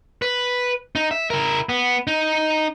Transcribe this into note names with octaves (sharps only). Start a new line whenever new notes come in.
B4
D#4
E5
E4 A#4
B3
D#4